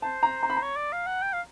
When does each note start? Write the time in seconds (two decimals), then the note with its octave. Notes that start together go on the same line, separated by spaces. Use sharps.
0.02 C5 A5
0.23 A#5
0.43 A#5
0.50 B5
0.57 A#5
0.62 C#5
0.76 D5
0.92 F5
1.07 F#5
1.22 G5
1.33 F5